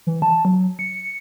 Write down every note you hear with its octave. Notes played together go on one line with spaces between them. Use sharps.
E3
A5
F#3
C#7